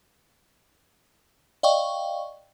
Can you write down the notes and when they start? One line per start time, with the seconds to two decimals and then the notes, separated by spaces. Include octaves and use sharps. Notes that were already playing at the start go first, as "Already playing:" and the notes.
1.63 D5 D#5 F5 G5 C#6